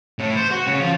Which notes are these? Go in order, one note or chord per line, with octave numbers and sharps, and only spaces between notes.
A2
C5
F#4
C#3
F3